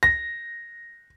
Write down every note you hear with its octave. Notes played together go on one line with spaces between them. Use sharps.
A#6